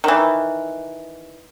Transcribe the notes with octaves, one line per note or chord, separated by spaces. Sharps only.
D#3 E3